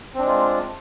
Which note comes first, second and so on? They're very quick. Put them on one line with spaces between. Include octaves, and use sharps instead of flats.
C4 D4 G#3 F4